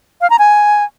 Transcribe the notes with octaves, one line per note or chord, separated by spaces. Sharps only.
F5
A#5
G#5